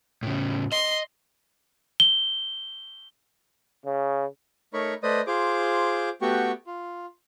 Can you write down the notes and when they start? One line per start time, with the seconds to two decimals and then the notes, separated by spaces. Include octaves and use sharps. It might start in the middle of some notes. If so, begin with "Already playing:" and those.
0.23 A2 C#3
0.72 D#5 C6
2.00 G7
3.85 C#3
4.74 A3 D#4 A#4 C#5 B5 C#6
5.03 A3 B4 C5 D5 D#5 D#6
5.27 F4 G#4 C5 D6
6.22 A3 B3 F#4 G4 G5 C#6
6.67 F4